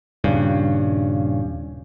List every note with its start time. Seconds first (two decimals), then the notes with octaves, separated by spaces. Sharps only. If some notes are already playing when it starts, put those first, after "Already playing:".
0.24 D#1 G2 C#3